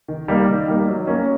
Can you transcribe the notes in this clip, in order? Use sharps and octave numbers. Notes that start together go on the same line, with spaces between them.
D#3
G3 A#3 D#4
D#3
G3 A#3 D#4
F#3
A#3 C#4